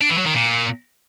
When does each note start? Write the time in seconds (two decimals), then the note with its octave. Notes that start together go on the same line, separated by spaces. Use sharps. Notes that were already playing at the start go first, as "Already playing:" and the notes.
0.01 D4
0.10 E3
0.18 F#3
0.26 D#3
0.35 A#2